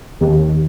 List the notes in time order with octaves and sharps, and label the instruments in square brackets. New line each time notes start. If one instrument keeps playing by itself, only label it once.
[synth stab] D#2